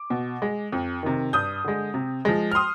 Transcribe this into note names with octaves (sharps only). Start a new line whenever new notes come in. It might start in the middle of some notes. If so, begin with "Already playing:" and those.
Already playing: D6
B2
G#3
F2
C3 D#3
G2 D#6 G6
D3 G#3
C3
F3 G#3
F6
C6 D#6